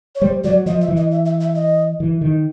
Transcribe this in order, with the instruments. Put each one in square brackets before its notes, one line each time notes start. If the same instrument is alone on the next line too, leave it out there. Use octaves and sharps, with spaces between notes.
[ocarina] C#5
[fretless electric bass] G3 [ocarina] C5
[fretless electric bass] F#3 [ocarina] D5
[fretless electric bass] F3 [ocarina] D#5
[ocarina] E5
[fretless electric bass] E3
[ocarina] D#5
E5
E5
E5
D#5
[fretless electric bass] E3
D#3